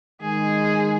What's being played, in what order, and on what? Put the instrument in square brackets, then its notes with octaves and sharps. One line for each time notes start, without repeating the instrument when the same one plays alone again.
[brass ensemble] D#3 G#3 [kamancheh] G#4